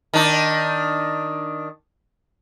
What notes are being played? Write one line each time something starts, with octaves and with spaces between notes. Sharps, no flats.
D#3 D4